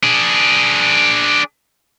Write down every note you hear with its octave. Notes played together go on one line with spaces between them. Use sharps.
D4 G#4